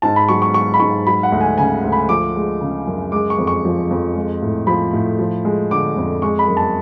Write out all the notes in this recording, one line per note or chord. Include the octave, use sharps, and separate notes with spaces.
G#2 A5
B5
F#3 C#6
C#6
F#3 C#6
B5
G#2 C#6
F#3 B5
F#5
D2
G#5
C#3 G#5
D2
B5
F3 D6
G#3
C#3
F#2
G#3 D6
C#6
F2
C#6
F3
F2
G#3
A2
F3 B5
A2
F3
G#3
D3 D6
F2
G#3 C#6
B5
F#2
A5